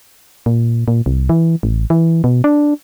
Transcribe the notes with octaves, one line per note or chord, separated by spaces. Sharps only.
A#2
A#2
C2
E3
A1
E3
B2
D4